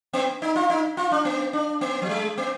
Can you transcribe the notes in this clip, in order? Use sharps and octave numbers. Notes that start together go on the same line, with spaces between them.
B3
D#4
F4
D#4
F4
D4
B3
D4
B3
F#3
G#3
B3